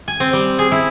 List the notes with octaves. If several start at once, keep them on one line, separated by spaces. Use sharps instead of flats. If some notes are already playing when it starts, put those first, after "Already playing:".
G#5
C4
G3
G#4
E4